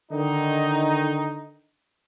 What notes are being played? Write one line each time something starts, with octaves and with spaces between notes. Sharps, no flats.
D3 D#3 D#4